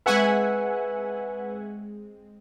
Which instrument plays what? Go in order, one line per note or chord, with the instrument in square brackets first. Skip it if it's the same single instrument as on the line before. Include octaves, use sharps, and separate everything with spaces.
[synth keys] G#3 C4 G#4 [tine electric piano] B4 C#6 [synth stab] E5 F#5 G#5